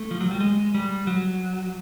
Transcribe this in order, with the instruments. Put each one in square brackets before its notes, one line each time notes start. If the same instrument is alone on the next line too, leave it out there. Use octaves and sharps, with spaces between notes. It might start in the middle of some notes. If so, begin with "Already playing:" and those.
Already playing: [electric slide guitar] A3
F3
F#3
G3
G#3
G3
F#3